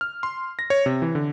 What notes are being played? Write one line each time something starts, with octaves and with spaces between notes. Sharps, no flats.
F6
C6
A#6
C#5
C3
E3
D3